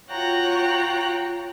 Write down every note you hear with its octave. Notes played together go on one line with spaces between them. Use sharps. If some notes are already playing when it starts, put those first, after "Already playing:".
F4 F#4 C#5 G5 A#5 F#6